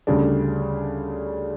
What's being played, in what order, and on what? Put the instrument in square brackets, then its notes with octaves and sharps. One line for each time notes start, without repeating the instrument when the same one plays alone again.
[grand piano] D2 C#3 G3 D4